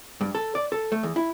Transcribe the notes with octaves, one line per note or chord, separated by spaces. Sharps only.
G2
A4
D5
A4
A3
E2
E4